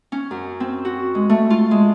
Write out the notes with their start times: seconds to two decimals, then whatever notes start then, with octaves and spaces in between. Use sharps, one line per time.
0.12 C#4
0.31 F#2
0.60 C4
0.85 F#4
1.15 G#3
1.29 A3
1.50 F4
1.71 G#3